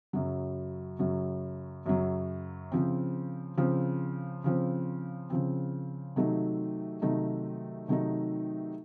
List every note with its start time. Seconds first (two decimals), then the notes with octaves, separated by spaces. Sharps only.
0.13 F#2 C#3 F#3
0.99 F#2 C#3 F#3
1.86 F#2 C#3 F#3
2.72 C#3 F3 C4
3.57 C#3 F3 C4
4.44 C#3 F3 C4
5.30 C#3 F3 C4
6.16 C3 D#3 F#3 A3 D#4
7.02 C3 D#3 F#3 A3 D#4
7.88 C3 D#3 F#3 A3 D#4